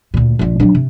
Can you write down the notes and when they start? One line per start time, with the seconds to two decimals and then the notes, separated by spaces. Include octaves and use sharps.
0.14 D2 A#2
0.39 A#1 A#2
0.60 F#3 D4
0.75 C3